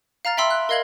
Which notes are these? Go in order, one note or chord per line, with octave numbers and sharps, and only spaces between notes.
F5 A#5 F6 A6
E5 G5 B5 C6 E6
F#6
A#4 D#5 F5 G#6 F#7 G7